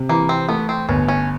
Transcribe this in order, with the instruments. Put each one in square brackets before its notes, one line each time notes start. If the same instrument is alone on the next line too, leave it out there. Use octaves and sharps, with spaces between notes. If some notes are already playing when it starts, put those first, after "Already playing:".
Already playing: [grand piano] C3
[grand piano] E3 [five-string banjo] A#3
[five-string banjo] C4
[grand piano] A3 [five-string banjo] B3
[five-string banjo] C4
[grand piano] G1 [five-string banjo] C#4
[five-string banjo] C#4